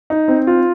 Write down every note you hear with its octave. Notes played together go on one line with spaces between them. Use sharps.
D#4
C4
F4